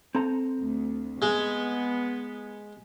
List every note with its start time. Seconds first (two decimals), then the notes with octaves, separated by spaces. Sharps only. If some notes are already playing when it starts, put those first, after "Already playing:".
0.15 C4 A4 A#5
0.59 D2
1.22 G#3 B3